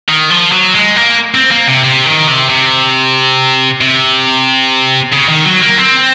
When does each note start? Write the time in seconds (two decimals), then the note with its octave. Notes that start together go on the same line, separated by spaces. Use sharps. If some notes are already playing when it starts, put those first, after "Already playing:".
0.09 D#3
0.31 F3
0.52 F#3
0.75 G#3
0.96 A#3
1.35 C4
1.51 A#3
1.67 C3
1.84 C3
2.06 D#3
2.28 C3
2.50 C3
3.81 C3
5.12 C#3
5.29 D#3
5.45 F#3
5.62 A#3
5.78 C4